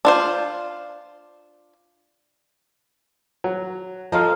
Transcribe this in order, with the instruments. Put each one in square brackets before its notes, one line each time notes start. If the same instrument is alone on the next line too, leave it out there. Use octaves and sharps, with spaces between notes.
[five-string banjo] D4 F4 C5
[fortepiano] F#3
[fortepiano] F3 [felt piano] A4 D#5 A#5 [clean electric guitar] C5 F5